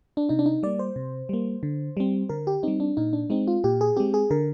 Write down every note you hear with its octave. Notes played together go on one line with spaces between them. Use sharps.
D4
C3 D#4
D4
D#4
G3 A#3 D5
C5
C3
G3 A#3
D3
G3 C4
D3 A#4
G4
G3 C4 D#4
D4
A#2 D#4
D4
G#3 C4 D#4
F4
A#2 G4
G#4
G#3 C4 G4
G#4
D3 A#4